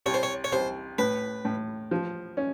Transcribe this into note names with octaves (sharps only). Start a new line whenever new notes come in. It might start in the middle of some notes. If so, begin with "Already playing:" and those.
C2 C#5
C5
C#5
C#5
C2 C5
A2 B4
A2
F3
C#4